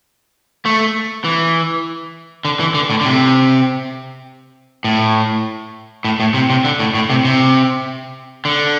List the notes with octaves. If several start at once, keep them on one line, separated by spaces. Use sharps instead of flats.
A3
E3
D3
E3
D3
A2
D3
C3
A2
A2
A2
C3
C3
D3
A2
A2
C3
C3
D3